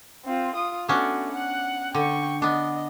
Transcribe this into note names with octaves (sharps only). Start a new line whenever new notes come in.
C4 F4
F4 D#6
A3 B3 C#4 D4 F#4
F#5 F#6
D3 G5 C#6
B3 D4 D#5